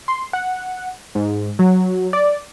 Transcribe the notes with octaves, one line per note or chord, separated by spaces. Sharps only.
C6
F#5
G#2
F#3
D5